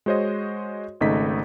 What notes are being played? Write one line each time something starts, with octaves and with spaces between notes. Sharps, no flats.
G#3 F#4 C5 C#5 D#5
G#1 C#3 A3 D#4 D#5 B6